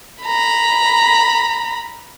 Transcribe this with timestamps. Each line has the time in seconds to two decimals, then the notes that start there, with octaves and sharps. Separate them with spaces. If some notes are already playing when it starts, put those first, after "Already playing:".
0.24 A#5 B5